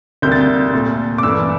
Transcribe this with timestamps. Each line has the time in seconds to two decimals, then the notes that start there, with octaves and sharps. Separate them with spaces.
0.22 D2 C3 G3 A#3 G6
0.32 A6
0.41 G6
0.73 C2 A#2 A3
1.18 D6
1.23 G2 E3 A3 E6